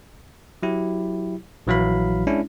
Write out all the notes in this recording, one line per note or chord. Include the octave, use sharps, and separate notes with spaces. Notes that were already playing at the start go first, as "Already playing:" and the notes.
F#3 E4 G4
A#1 E3 F#3 E4 F5 B5
G#3 C#4 D4 E4